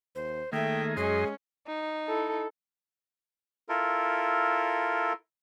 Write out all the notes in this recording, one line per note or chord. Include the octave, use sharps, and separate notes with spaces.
D#2 C5
D#3 A3 A#3 G#4 E5 G5
F#2 G#3 C#4 G#4 D#5 C6
D#4
E4 A4
E4 F4 A4 A#4